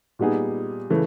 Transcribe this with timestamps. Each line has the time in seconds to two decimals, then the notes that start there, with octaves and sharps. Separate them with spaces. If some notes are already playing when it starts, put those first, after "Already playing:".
0.19 A#2 G3 B3 D#4 G#4
0.90 C#3 E3 A3